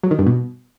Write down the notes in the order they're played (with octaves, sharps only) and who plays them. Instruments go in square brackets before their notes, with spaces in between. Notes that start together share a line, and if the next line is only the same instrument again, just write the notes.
[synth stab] F#3
D#3
G2
B2